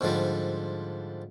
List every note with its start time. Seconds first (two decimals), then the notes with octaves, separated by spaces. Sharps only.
0.01 G#2 D3 F3 G3